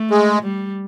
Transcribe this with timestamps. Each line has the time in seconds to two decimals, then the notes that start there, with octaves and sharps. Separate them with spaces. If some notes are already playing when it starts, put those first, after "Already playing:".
Already playing: A3
0.11 G#3
0.42 G3